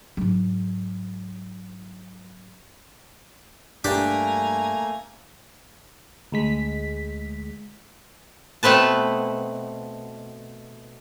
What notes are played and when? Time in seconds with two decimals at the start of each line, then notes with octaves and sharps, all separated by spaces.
0.17 G#2 F#3
3.84 G2 A3 A#3 D4 G4 G#5 A#5
6.32 D2 G#3 B6
8.63 B2 A3 C4 B4 A5